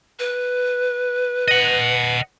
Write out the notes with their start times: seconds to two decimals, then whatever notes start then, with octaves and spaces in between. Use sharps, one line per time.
0.19 B4
1.48 D#5 F#5